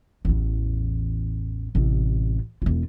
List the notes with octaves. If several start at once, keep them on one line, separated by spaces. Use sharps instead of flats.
A1 E2
A1 C3
E1 F4